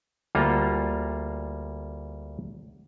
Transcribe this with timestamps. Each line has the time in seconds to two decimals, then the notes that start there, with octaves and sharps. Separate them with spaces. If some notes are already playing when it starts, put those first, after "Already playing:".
0.35 D2 G3 A#3 F4 A4 A#5